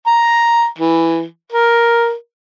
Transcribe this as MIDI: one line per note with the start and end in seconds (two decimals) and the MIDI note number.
0.07 0.67 82
0.78 1.25 52
1.52 2.14 70